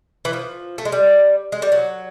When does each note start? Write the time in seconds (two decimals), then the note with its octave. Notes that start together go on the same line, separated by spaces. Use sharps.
0.25 E3
0.33 F3
0.78 A3
0.85 G#3
0.92 G3
1.52 G#3
1.62 G3
1.72 F#3